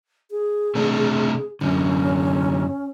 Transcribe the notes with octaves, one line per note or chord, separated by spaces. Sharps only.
G#4
C3 A3 D4
F#2 D3 C#4